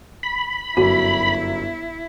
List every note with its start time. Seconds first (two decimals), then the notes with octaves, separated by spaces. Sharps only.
0.23 B5
0.77 G1 F#2 E4 F#4